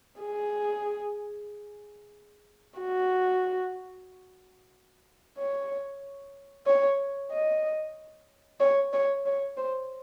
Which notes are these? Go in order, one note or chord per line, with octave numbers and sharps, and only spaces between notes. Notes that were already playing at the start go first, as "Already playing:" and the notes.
G#4
F#4
C#5
C#5
D#5
C#5
C#5
C#5
C5